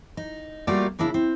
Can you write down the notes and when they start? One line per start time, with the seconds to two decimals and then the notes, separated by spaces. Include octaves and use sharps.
0.17 D#4
0.67 G3 A3 A#3 F4 F#4 D5
0.99 C#3 A#3 D4 E4
1.14 C4